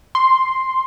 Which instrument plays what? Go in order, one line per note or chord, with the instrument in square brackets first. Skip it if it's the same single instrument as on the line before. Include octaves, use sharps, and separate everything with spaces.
[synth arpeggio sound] C6